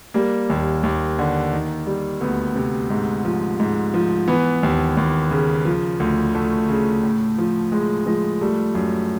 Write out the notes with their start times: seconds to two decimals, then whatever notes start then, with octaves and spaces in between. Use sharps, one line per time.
0.14 G3 A#3
0.50 D#2
0.83 D#2
1.19 D3
1.53 D#3
1.87 G3
2.21 D2 B3
2.56 C3
2.90 G#2
3.25 F3
3.60 G#2
3.94 F3
4.28 E3 B3
4.63 D#2
4.97 D#2
5.31 C#3
5.65 F3
6.00 D2
6.35 D2 A3
6.69 C#3
7.03 A2
7.38 F3
7.72 A2 G#3
8.06 F3 G#3
8.41 G3 A3
8.75 F#2